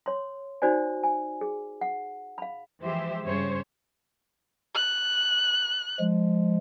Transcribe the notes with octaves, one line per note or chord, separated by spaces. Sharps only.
C#5 C6
D#4 F#4 C5 D5 G#5
G#5
G#4
F#5
F5 B5
E3 F3 G#3 G4 C5 E5
G2 C#3 C5 C#5
F#6
F3 G#3